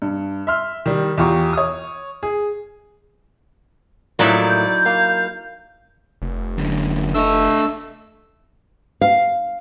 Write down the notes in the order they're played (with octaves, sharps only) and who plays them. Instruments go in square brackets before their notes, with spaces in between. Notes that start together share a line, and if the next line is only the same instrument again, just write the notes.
[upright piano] G2
E5 C6 F6
D#3 G3
E2 F4 G4 A#5 C#6
C#5 D#6
G#4
[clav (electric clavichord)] A2 F3 A#3 [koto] F#3 D#4 E4 [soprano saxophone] D5
[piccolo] G6
[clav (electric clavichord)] A#3 [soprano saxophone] F5
[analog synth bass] F1
[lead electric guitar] F#2 D3
[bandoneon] A3 E6 [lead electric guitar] D4 D#5
[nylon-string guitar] F5